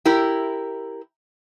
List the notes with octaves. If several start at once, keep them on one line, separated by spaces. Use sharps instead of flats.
E4 G4 A#4